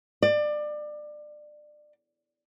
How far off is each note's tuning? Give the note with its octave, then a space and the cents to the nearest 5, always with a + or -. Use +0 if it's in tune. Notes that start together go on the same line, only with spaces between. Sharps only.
D5 +25